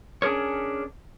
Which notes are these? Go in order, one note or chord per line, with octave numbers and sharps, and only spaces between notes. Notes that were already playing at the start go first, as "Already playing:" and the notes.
C#4 D4 G#4 A#4 C#5